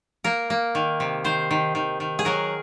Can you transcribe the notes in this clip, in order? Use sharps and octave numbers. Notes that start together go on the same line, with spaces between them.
A#3 A#4
A#3
D#3
C3
D#3 C5
D#3
D#3
D#3
G#4
F#3 A#4